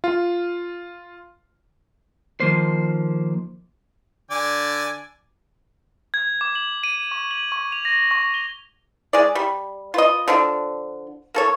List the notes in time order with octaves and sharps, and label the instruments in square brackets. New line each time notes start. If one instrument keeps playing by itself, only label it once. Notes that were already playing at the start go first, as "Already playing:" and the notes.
[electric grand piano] F4
[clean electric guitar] D#3 F3 A#3 C5
[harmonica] D3 D5 G#5
[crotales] G#6
D6
F#7
D#7
C#6
F#7
C#6
F7
A#6
C#6
G7
[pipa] G#3 G#4 D5
G3
F4 B4 D#5
D3 F3 D4
A#3 A4 C#5